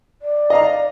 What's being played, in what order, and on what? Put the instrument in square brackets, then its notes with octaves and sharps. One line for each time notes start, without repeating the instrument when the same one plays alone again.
[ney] D5
[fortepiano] D#5 F5 A#5